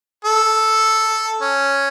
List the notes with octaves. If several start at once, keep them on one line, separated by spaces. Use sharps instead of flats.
A4
C#4